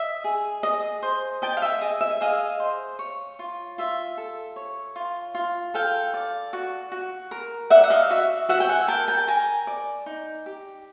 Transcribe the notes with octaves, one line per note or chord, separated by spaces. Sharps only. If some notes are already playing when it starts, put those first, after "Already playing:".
Already playing: D#5 E5
G#4
G#4 D#5
C5
D#5 G5 A5
F5
E5
G#4 D#5
E5
G#4 D#5 F5
C5
C#5
F4
F4 E5
A4
C#5
F4
F4
A4 F5 G5
D5
F#4
F#4
A#4
D5 E5 F#5
F#5
D#5 F5
F#4 E5
F#4 E5 F#5
G5
F#5 G#5
A#4 G5 A5
G5 A5
A#4 G#5 A#5
D5
D#4
G4